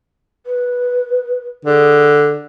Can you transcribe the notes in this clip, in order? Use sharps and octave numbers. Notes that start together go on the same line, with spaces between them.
B4
D3 G#4